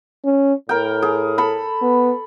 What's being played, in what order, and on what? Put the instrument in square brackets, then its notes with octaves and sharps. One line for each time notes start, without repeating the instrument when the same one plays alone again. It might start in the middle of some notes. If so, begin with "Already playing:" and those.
[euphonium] C#4
[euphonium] A2 [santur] A#4 G5
[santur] G#4
A4 B5
[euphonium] B3